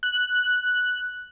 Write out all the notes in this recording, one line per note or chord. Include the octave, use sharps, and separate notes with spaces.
F#6